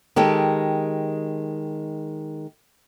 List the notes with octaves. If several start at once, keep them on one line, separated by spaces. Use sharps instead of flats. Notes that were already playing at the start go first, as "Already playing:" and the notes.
D#3 G#3 G4 A4